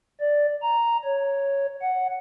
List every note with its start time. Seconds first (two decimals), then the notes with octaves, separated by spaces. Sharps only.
0.20 D5
0.62 A#5
1.04 C#5
1.82 F#5